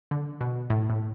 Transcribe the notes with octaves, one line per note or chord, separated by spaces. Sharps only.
D3
B2
A2
A2